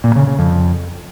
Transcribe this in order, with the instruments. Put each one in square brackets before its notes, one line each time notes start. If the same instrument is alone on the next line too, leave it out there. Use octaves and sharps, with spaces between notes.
[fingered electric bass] A#2
C#3
C#3
F2